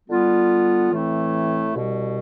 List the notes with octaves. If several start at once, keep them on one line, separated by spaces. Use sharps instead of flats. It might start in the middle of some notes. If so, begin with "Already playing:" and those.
D3 G3 B3 F4
A2 E3 A3 C4 E4
C2 B2 G3